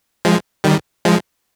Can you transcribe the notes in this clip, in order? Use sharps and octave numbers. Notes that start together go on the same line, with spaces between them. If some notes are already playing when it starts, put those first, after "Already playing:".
F3 G#3
D#3 G3
F3 G#3